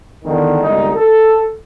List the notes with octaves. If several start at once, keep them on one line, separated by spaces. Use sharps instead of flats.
E2 D3 D#3
G1 C2 G#3 D#4
A4